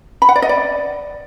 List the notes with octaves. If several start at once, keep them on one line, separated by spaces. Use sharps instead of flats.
B5
F#5
D5
D#5
D5